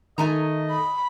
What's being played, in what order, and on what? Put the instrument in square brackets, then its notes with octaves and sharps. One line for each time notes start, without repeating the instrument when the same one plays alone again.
[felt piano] D#3 [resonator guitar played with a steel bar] A3 G#5 A#5 [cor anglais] D#5
[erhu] B5